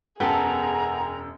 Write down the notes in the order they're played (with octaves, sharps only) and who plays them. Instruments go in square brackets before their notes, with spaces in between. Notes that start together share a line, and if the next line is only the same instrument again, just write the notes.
[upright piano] E1 F#2 G5 [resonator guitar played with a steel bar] B3 A4 [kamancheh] G#4 [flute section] A#5